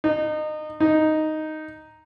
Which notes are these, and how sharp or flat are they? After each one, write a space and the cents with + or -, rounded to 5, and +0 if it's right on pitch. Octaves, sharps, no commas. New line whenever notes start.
D#4 -25
D#4 +0